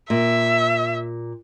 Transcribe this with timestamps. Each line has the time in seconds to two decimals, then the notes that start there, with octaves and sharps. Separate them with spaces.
0.10 A#2 E5